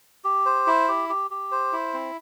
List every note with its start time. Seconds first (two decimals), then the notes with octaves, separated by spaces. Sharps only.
0.24 G4
0.46 C5
0.67 E4
0.88 G4
1.09 G4
1.31 G4
1.51 C5
1.72 E4
1.94 C4